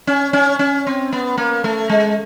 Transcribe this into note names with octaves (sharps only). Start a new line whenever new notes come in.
C#4
C#4
C#4
C4
B3
A#3
A3
G#3